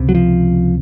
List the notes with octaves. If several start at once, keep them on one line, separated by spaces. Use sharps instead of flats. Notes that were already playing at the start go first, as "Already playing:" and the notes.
Already playing: C#2 C3
F#3
F3